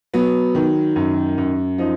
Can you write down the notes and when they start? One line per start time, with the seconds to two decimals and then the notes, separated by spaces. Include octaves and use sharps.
0.14 F#3 B3
0.55 D#3
0.96 F#2
1.38 F#2
1.78 F3 D#4